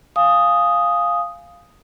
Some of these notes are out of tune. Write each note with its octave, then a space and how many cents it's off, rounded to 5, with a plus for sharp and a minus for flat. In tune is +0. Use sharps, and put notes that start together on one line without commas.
F5 +0 G#5 +0 D#6 +0